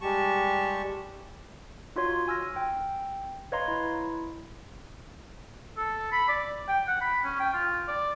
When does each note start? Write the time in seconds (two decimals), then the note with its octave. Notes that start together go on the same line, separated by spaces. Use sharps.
0.01 G3 G#3 G4 A5 C#6
1.96 D#4 F4 F#4 C#5 C6
2.28 G#5 E6 F6 A#6
2.56 G5
3.52 B4 C#5 D#5 F5 A#5 C6
3.68 E4
5.77 A4
6.12 B5
6.28 D5
6.68 G5
6.88 F#5
7.01 B5
7.24 C#4
7.39 G5
7.53 F4
7.88 D5